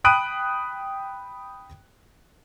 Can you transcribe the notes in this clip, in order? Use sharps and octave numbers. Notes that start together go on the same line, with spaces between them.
G5 B5 D#6 F#6 D7 D#7